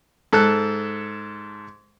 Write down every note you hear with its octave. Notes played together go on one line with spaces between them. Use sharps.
G#2 A4 A5 E6 F#6